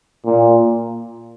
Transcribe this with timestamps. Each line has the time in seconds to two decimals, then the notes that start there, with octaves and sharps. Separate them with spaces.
0.25 A#2